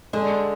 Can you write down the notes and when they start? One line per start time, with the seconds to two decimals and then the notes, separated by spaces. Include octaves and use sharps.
0.13 D3 G#3